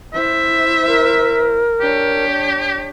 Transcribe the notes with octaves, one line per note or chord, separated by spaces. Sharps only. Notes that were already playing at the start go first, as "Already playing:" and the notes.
E4 C5 E5
A#4
D4 G4 C#5